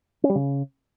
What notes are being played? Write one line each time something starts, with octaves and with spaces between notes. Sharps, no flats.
C#4
G3
C#3